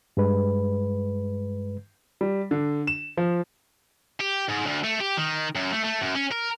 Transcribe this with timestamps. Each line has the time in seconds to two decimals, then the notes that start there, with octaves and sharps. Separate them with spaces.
0.17 G2 G#3 B4
2.21 G3
2.51 D3
2.87 E7
3.17 F3
4.21 G4
4.49 G#2
4.67 D2
4.84 A3
5.00 G4
5.17 D#3
5.55 F#2
5.72 A3
5.84 A3
6.02 F#2
6.16 C#4
6.32 A#4